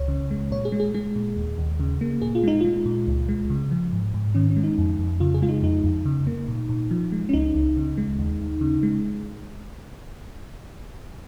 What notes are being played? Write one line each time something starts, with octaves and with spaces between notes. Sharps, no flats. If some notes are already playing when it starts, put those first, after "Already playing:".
Already playing: C#2 C#5
C#3
G#3
A#2 C#5
G#4
G#3
G#4
G#3 G#4
A#2
D#2
D#2
C#3
A#3
A#2 G#4
F4
G#3 D#4
G#3 F4
A#2
C#2
G#3
C#3
F3
G#2
G#2
D#3 C#4
C#4
G#3
D#4
F2
F2
C#3 F4
G#4
G#3 F4
D#4
F2 D#4
F2
C#3
A#3
A#2
A#2
F3
G#3
C#4
C#2 D#4
C#2
C#3
G#3
D#2
D#2
C#3
G#3